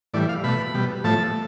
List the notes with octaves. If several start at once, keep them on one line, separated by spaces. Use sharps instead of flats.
A2 E3 G3 D5
F5
B2 A3 B5
B2 G3
A2 F3 A3 A5